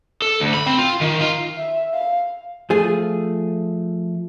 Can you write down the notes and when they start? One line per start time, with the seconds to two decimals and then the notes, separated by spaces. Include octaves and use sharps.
0.22 A4
0.40 D2
0.54 B5
0.66 C4
0.79 F4
1.01 D#3
1.21 F4
1.56 E5
1.93 F5
2.70 F3 A3 G#4